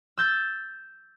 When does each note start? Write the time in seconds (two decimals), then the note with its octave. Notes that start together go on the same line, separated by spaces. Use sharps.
0.18 E6 G6 A6